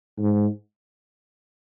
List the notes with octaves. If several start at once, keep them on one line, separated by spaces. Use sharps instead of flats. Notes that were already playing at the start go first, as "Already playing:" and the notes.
G#2